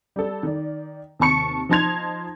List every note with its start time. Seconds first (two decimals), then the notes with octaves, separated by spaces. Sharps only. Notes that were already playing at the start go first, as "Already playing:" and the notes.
0.16 G3 A4
0.43 D#3 D5
1.20 D#2 C3 A5 C#6 C#7
1.69 F3 D#4 A5 C6 G#6 F7